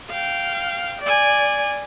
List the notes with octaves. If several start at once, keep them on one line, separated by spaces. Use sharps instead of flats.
F5 G5
D5 G#5